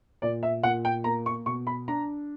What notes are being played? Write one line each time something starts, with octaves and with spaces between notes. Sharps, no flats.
A#2 D5
E5
A#2 F#5
G5
A#3 A#5
C#6
B2 C#6
B5
D4 A#5